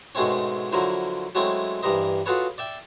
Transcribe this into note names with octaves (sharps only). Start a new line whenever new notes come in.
G#2 B2 G#3 A3 C4 C#4
D3 F3 F#3 E4 A#4 C5
F#3 G#3 A3 C4 C#4 E4
G2 E3 G3 A#4 C5 D#5
F4 F#4 G#4 A4 B4 C#5
D5 E5 G5